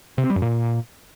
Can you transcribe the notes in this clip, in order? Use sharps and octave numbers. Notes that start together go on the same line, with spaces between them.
C3
C4
G3
F#2
A#2